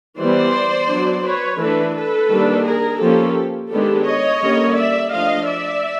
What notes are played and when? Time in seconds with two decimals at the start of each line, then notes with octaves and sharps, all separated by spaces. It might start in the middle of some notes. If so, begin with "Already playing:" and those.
0.19 E3 G3 B3 C5 D5
0.90 F#3 B3 D4
1.25 B4 C#5
1.60 E3 A3 D4 A4 B4
1.95 A4 B4
2.30 D#3 G3 A#3 D4
2.66 G#4 A#4
3.01 F3 A#3 C#4 G4 A4
3.72 D#3 G#3 B3 D4 G4 A4
4.07 C#5 D#5
4.42 D3 G3 A#3 C#4
4.77 D5 E5
5.12 F3 A3 D4 D#5 F5
5.48 D5 E5